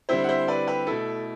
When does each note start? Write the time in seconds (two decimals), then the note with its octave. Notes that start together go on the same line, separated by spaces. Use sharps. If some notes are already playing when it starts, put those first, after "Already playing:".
0.09 D3 G3 C4 E4 C5 E5
0.24 F#5
0.29 C5 E5
0.48 B4 D5
0.67 G4 B4
0.87 B2 A3 E4 A4